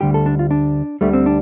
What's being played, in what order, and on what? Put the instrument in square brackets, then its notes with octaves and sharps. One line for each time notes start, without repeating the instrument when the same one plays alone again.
[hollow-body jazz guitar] D2 D3 G3 G4
A4
D4
F4
D4
D2 D3 G3 A3
C4
D4